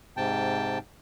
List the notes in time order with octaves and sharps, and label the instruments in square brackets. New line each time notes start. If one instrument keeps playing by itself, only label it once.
[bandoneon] G#2 C3 G5 A5